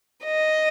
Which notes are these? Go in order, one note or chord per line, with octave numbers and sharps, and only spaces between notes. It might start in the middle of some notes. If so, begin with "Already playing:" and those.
D#5